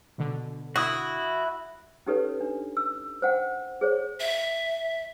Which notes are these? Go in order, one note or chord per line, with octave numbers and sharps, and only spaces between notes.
B2 D3
E4 F#4 D#6
C#4 D#4 G4 A4 B4 C#5
D4
E6
C5 F#5 G5
G#4 C5 C#5
E5